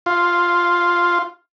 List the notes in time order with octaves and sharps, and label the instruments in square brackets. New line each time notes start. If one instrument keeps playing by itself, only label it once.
[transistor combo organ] F4